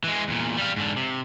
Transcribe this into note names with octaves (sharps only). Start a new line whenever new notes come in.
E3 G#3
E2 A#2
G3 F5
G#2 D3
C3